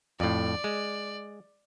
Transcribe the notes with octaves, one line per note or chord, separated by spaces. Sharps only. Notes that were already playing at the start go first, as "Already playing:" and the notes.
F2 A2 D5
G#3